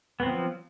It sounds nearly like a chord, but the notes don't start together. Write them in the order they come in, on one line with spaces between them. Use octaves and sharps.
B3 C4 F#3 F3